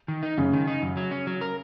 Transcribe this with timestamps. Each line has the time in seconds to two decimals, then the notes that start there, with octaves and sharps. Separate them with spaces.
0.08 D#3
0.23 D#4
0.38 F#2 C#3
0.53 D#3
0.67 D#4
0.82 F#2
0.97 F#3
1.11 C#4
1.27 F#3
1.41 A#4